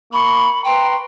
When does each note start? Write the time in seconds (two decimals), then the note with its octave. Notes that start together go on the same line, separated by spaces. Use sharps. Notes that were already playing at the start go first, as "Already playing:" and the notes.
0.13 A#3 B5 C#6
0.64 B4 G5 A#5 C6